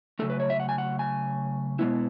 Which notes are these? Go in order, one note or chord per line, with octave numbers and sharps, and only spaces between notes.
C#3 F#3 A3 A4
B4
C#5
E5
F#5
G#5
F#5
G#5
B2 G#3 B3 E4